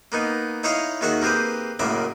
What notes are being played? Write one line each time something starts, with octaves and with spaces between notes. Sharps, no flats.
A#3 B3 D#4
D#4 E4 C#5 D#5 F5 A#5
D#2 D#3 F#4 G#4 E5 F#5
A#3 C4 G4 G#4 B4
A1 F#2 C#3 A#3 E5 D6